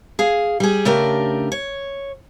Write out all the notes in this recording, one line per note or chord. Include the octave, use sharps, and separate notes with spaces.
G#4 F5
G3 G#4
C#3 A3 D4 G4 A#4
C#5